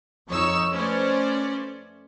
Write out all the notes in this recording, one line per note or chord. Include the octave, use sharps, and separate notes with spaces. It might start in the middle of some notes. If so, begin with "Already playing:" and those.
F2 D#4 C#5 C#6 E6
A3 C#4 B4 C5 D5